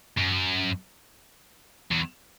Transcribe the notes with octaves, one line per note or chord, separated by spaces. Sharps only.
F#2
E2